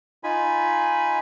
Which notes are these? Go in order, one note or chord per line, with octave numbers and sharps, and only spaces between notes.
D#4 F4 G#5 B5